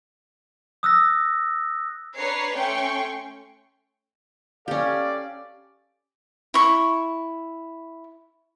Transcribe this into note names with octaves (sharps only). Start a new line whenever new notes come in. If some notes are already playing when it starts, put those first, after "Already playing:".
D#6 E6 F#6 A#6
D4 B4 C#5 A#5 C7
A3 C#4 G5 C6 C#6
C#4 G4 A4 D5 F5
E4 C#6